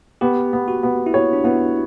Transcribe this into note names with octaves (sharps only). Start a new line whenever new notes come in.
B3 G4
B3
F#4
B3
E4
F#4 C#5
D4
B3 E4